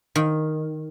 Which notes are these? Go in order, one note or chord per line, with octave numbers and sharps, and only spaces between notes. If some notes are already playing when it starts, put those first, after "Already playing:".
D#3